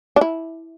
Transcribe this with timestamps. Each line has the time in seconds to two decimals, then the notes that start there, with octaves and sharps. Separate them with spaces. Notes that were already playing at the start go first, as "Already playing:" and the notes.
0.16 D4
0.21 E4